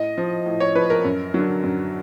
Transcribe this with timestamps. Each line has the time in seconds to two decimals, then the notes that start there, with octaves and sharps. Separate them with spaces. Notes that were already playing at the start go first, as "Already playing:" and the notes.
Already playing: A2 D#5
0.18 F3
0.46 A2
0.60 C#5
0.75 F3 B4
0.90 A#4
1.05 F#2
1.34 D3 F#3
1.64 F#2